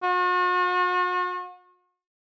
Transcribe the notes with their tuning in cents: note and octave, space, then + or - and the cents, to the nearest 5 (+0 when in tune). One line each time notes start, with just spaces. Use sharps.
F#4 -40